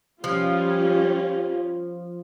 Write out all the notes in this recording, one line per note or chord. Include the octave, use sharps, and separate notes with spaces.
F3 G3 C#4 F4 G4